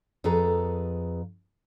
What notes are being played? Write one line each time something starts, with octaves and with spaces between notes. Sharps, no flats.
F2 G#4 A4 B4 A#5